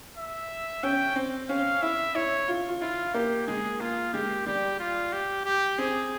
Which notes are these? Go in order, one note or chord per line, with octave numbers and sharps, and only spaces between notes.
E5
C#4 G5
C4
C#4 F5
E4 E5
E4 C#5
F4
F4
E4 F4
A#3 G4
G#3 G#4
A#3 F4
G#3 G4
G3 G4
F4
G4
G4
C4 G#4